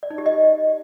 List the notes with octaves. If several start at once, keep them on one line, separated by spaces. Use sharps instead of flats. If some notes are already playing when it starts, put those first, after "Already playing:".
D5
D#4
G4
D#5